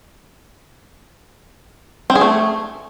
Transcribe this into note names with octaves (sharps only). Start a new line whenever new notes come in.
C4
G#4
A3